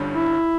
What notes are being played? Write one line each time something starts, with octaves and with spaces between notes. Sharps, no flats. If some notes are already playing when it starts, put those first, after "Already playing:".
Already playing: G1 G2 D3 G3 C#4
E4